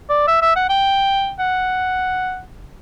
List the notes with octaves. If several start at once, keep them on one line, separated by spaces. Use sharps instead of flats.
D5
E5
E5
F#5
G5
F#5